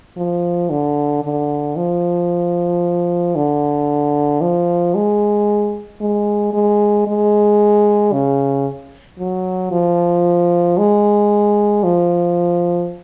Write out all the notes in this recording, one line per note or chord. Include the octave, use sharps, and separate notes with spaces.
F3
D3
D3
F3
D3
F3
G#3
G#3
G#3
G#3
C#3
F#3
F3
G#3
F3